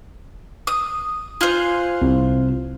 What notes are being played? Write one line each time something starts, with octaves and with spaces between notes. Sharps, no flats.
D#6
F4 C5 G#5 F6 F#6
C2